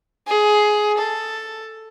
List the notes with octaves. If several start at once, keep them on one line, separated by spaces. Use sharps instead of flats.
G#4
A4